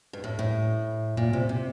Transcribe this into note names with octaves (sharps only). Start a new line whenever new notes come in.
G2
A2
A2
A#2
C3
C3